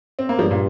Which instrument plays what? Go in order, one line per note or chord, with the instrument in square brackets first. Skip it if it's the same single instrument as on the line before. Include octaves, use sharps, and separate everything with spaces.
[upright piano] C4
A#3
[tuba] G2 [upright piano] F3 G#3
[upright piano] A#2